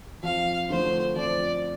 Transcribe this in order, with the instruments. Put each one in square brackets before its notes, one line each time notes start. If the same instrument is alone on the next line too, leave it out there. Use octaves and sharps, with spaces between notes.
[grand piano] F2 [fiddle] F5
[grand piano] D3 F3 A3 [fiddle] C5
[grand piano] F2 [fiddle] D5